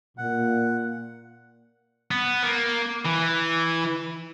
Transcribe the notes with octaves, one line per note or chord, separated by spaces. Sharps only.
A#2 F#5
B3
A#3
E3